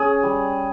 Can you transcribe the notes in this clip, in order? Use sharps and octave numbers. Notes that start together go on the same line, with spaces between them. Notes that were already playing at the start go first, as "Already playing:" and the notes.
Already playing: C#4 G#4
G3